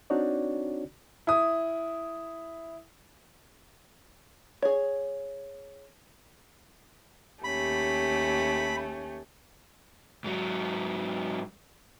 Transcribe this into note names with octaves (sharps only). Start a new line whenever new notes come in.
C4 D4 D#4 F#4 C#5 D5
E4 D#6
G#4 C#5
D#2 A3 C#4 G4 B5
G#2 F#3